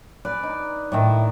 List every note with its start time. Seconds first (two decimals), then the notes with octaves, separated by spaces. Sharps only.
0.25 B4 D5
0.43 D#4
0.92 A2 D#3 E4 D5